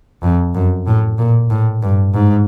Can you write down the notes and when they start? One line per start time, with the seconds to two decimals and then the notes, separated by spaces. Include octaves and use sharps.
0.23 F2
0.54 F#2
0.87 A2
1.18 A#2
1.50 A2
1.82 G2
2.14 G#2